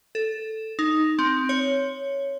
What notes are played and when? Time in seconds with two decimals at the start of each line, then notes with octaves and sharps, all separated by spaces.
0.15 A4
0.79 D#4
1.19 C4
1.49 C#5